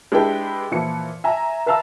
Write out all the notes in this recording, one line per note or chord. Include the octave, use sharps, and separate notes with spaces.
G#3 D4 E4 G4 B4 G5
A#2 E3 F3 C#7
E5 G#5 A#5
B4 E5 F5 A5 A#5 E6